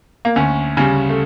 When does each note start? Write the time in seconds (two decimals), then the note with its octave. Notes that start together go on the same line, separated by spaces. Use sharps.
0.25 A#3
0.36 D2 C#4
0.77 C#3 G3 C#4
1.09 A3